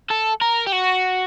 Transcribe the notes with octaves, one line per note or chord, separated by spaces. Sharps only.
A4
A#4
G4
F#4